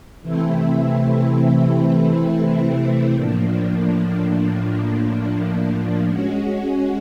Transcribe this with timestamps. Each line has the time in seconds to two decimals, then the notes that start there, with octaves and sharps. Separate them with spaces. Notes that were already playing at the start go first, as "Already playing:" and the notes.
0.21 C3 E3 A3 C4 E4
3.15 A2 F3 A#3 D4
6.08 G#3 C#4 F#4